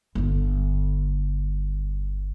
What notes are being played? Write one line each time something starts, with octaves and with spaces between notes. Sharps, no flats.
G1 D3